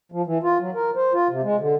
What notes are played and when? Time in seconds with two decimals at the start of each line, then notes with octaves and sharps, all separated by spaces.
0.12 F3
0.26 E3
0.43 F4
0.60 F#3
0.75 A#4
0.96 C5
1.14 F4
1.29 C3
1.43 G#3
1.60 D3